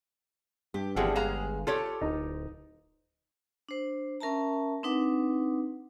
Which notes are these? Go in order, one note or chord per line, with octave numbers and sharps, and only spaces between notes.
G2 G4
G1 D3 E3 F3 G4 G#4 F#5
G#3 F5 A#5
F4 G4 A4 C#5
D1 D#4
D4 C5
C#4 A#4 E5 A5 A#5
C4 D4 D#4 B4 F#5 D6